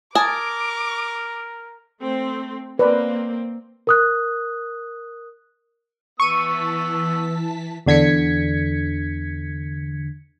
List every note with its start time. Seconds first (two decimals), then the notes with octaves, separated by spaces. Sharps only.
0.15 A#4 G#5 A5 D6 D#6
2.00 A3 C4
2.79 A#3 C4 B4 D5
3.87 A#4 D#6 F#6
6.20 E3 B3 A5 C#6 E6 B6 D#7
7.86 E2 D3 G#6 B6 C#7